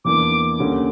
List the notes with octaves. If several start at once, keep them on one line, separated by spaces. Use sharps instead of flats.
E2 E3 A#3 D4 D6
D2 C#3 G3 A#3 C#4